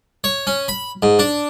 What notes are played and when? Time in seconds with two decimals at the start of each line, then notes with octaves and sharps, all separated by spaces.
0.24 C#5
0.47 C#4
0.68 B5
1.03 G#2
1.19 D4